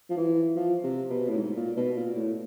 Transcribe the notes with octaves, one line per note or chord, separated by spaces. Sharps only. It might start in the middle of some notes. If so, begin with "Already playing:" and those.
F3
E3
F3
C3
B2
A2
G#2
A#2
B2
A#2
A2